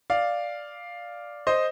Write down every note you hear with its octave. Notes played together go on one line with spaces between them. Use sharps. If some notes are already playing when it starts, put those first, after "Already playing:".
D5 F5
C5 D#5